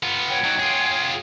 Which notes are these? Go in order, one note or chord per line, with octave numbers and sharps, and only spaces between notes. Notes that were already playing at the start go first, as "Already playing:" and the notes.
B3 F4
C#5 F#5 G5
F#3 D#4
F4 G#4